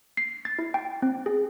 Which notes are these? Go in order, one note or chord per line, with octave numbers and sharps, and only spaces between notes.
C7
A6
E4
G5
C4
G#4